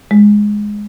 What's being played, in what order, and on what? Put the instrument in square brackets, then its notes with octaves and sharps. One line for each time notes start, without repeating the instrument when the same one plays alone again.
[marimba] G#3